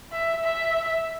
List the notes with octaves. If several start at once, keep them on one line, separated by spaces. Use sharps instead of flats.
E5
E5